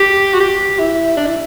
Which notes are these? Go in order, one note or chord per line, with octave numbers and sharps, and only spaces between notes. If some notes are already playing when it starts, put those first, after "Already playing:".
Already playing: G4
F#4
G4
E4
D4
E4